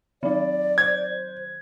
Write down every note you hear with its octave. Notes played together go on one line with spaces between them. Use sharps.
D#3 F#3 D5
C5 G#6